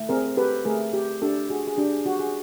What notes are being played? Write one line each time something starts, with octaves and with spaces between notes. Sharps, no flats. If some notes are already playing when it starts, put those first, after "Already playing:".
Already playing: A3
C4 G#4 A#4
G4 A4 B4
A3 G#4 A#4
G4
D4 G4 A4
F#4 G#4
G#4
D4 G4
G#4
F#4 G4
G#4